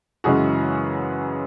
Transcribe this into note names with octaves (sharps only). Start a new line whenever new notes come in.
F#2 C#3 E3 G#3 C#4 F#4 G#4